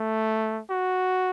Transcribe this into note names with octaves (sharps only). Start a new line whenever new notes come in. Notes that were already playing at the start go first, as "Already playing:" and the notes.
Already playing: A3
F#4